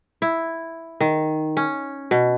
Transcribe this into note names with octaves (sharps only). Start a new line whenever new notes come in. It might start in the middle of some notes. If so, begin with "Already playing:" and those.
E4
D#3
C#4
B2